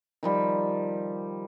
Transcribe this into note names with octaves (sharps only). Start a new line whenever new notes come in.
D#3 F3 G3